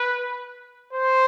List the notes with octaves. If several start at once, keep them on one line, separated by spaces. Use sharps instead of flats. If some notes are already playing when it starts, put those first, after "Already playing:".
Already playing: B4
C5